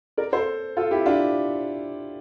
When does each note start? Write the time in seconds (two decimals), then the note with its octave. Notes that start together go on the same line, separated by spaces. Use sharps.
0.17 A#4 D5
0.32 A4 C5
0.77 F4 A4
0.91 E4 G4
1.06 D4 F4